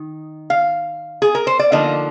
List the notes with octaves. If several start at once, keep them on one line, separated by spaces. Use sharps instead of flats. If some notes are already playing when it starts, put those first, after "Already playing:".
Already playing: D#3 D#4
F5
G#4
A#4
C5
D5
D3 F3 A#3 D#4 D#5